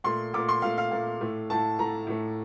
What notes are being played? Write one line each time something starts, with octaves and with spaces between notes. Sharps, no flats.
A#2 A3 C6
A#2 A3 D6
C6
A#2 A3 F5
F5
A#2 A3
A2 A3
A2 A3 A5
A2 A3 A#5
A2 A3